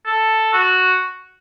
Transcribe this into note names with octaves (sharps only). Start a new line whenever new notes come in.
A4
F#4